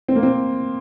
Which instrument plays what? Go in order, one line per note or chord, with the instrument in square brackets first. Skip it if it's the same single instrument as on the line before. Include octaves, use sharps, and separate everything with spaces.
[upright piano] C4
A#3
C4